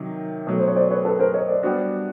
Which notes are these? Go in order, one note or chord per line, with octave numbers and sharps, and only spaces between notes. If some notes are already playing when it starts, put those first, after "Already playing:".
Already playing: C3 D#3 F#3
B2 F#3 A3
C5
C#5
C5 D5
B4 C#5
A4 B4
A#4 C5
C#5 D#5
C5 D5
G3 B3 D4 F#4